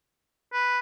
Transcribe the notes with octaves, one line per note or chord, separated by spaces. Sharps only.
B4